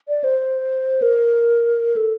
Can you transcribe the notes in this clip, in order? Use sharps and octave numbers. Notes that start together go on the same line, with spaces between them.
D5
C5
A#4
A4